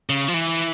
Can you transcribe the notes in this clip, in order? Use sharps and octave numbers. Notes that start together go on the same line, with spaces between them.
C#3
F3
E3